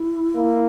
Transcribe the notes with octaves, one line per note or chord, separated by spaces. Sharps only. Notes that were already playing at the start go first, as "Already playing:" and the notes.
Already playing: E4
A#3